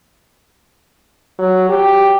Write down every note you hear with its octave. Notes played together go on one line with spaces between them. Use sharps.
F#3
G4